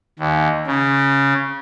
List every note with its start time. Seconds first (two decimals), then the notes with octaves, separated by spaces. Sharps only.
0.19 D#2
0.67 C#3